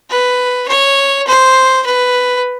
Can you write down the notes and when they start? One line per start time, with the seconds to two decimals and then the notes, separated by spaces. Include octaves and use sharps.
0.10 B4
0.68 C#5
1.27 C5
1.86 B4